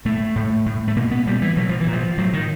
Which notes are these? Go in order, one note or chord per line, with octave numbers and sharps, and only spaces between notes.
A#2 A3
A2
A2
A3
B2 A#3
B3
A#2 G3
E3
B2 F#3
F3
E3
A#2
F3
A2 F#3
D#3